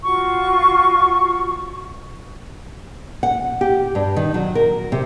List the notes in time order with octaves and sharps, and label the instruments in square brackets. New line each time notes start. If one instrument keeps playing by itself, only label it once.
[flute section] F4 F#4 F#5 C#6
[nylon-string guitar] F#5
G4
G2
D#3
F#3
A#4
C3